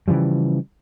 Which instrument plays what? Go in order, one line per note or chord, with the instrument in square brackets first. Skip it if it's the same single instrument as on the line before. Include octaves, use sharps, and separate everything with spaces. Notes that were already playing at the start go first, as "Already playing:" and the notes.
[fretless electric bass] C#3 E3 F3 G3